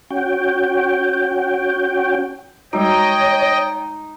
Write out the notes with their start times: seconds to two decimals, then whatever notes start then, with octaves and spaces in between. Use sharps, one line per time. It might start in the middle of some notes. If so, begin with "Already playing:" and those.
0.10 C#4 F#4 G5
2.73 G3 G#3 D#4 F#4 C#5 D#5 G5